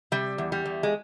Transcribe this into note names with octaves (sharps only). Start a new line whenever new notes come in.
C3 G3
E2
G3
E2
G#3